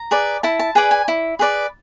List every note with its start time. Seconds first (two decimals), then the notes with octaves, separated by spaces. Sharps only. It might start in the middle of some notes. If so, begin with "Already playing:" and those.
Already playing: A#5
0.11 G#4 B4 D5
0.43 E4 A5
0.59 A5
0.75 G#4 B4 D5 G#5
0.91 G#5
1.08 E4
1.39 G#4 B4 D5